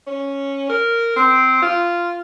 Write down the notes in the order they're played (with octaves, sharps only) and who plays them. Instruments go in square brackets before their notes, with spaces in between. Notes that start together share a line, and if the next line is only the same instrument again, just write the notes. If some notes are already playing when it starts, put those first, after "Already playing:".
[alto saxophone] C#4
A#4
C4
F4